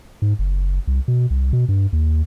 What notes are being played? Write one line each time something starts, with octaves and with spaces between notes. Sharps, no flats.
G#2
F#1
C2
B2
C2
B2
G2
D#2